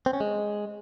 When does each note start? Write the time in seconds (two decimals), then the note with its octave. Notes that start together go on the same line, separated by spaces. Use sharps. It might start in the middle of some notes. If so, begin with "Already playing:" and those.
0.06 C4
0.13 C#4
0.20 G#3